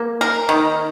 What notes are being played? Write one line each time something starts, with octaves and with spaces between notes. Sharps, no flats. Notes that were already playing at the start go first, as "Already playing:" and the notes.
Already playing: A#3
A#4
D#3